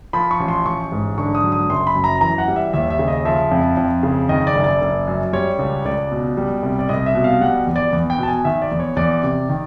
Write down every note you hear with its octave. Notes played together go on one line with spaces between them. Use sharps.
F3 B5
C#6
A1
C6
A1 C#6
G#2
D3 C#6
D#6
F#3
D#6
F#1 C6
B5
F#2
A#5
E3 A#5
F#5
G3
E5
D#2 E5
E5
C#3
D#5
F3 E5
F2
F2
C#3
D#3 D#5
D5
F#1
D5
F#1
F#2
G3 C#5
C#2
C#2 D5
B2
G3
C2
D5
C2 D#5
E5
B2
F5
G3 F#5
E2
D5
E2
G5
B2 A5
G#5
D#3 E5
D5
E2
C#5
E2 D5
C3
D#3